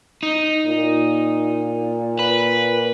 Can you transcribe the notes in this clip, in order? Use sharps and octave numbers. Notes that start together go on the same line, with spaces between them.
D#4
A#2
B4